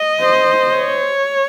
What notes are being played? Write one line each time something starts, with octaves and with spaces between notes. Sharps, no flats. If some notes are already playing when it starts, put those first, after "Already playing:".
Already playing: D#5
C5
C#5